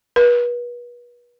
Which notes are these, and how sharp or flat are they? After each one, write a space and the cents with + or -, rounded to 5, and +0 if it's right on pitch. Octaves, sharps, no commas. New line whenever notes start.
B4 -35